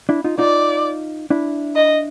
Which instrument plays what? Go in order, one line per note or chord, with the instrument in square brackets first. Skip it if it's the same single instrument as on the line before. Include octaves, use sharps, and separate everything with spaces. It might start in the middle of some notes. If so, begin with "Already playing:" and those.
[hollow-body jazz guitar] D4 E4
D#4 F4
[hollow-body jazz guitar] D#4 F4 [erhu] D5
[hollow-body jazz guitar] D4 E4
[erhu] D#5